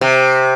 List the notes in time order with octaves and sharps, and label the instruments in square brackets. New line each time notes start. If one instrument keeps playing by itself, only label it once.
[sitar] C3